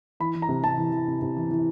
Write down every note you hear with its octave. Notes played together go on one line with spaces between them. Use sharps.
E3 B5
E3
A#5
C3
C3 A5
E3
E3
C3
C3
E3
E3